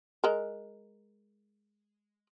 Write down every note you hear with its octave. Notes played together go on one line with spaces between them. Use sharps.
G#3 A#4